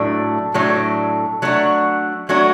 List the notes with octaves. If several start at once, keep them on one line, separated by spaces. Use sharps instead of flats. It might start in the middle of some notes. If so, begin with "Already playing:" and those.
Already playing: A2 F#3 A3 D4
A2 F#3 A3 D4
F#3 A3 D4 F#4
F#3 A3 D4 F#4